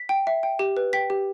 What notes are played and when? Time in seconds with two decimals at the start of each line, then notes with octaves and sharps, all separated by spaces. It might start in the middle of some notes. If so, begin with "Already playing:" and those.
Already playing: B6
0.09 G5
0.27 E5
0.43 G5
0.59 G4
0.77 B4
0.93 G5 B6
1.10 G4